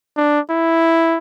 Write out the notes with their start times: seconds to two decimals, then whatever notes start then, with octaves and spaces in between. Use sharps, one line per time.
0.17 D4
0.50 E4